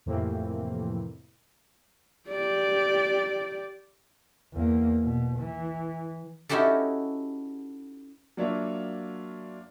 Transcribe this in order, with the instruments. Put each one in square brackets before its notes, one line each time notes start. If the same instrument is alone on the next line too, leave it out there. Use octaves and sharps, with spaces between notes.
[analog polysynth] F2 A2 C3 E3 A#3 C4
[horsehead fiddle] G4 D5
[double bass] E2 A#3
B2
E3
[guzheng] C#4 D#4 E4 F#4 G4 A4
[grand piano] F#3 A#3 D4 F4 C#5 E5